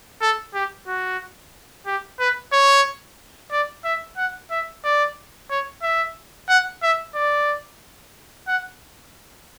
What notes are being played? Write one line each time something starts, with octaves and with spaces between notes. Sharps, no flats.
A4
G4
F#4
G4
B4
C#5
D5
E5
F#5
E5
D5
C#5
E5
F#5
E5
D5
F#5